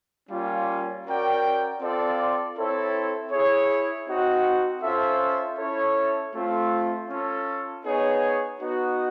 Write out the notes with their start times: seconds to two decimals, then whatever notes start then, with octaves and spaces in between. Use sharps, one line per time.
0.30 G3 A#3 C#4 F4
1.05 C#4 F#4 A#4 D5 G5
1.81 C4 F4 A4 D5
2.56 C4 E4 A4 C#5
3.31 E4 G#4 C#5
4.06 C4 D#4 F#4
4.82 C#4 F4 A4 C5 E5
5.58 C#4 E4 A4 C#5
6.33 A3 C4 F4 A4
7.08 C#4 F4 A4
7.84 B3 D#4 G#4 C#5
8.59 B3 D#4 F#4